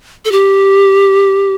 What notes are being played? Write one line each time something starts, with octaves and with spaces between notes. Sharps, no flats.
A4
G4